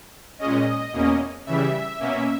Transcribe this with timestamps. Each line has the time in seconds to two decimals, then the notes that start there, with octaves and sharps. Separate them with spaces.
0.39 A#2 G#3 C#4 D#5
0.93 E2 B2 A#3 C#4
1.46 C#3 E3 G3 E5
1.99 B2 A#3 C#4